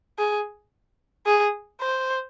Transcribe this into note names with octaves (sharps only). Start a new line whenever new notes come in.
G#4
G#4
C5